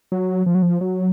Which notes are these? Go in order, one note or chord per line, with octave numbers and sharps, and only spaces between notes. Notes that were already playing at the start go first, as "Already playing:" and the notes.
F#3
F3
F#3
F3
F#3